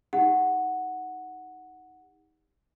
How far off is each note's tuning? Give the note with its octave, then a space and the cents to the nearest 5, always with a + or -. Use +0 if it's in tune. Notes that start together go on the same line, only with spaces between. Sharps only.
D#4 +20 G4 +40 F#5 +0